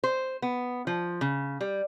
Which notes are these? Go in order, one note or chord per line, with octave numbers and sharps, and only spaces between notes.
C5
B3
F3
C#3
G3